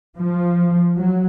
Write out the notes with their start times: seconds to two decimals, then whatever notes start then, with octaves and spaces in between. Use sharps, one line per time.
0.17 F3
0.98 F#3